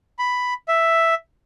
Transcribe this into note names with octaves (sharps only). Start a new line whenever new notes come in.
B5
E5